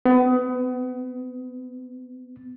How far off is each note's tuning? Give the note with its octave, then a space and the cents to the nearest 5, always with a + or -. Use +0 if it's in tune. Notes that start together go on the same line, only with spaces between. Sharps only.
B3 +30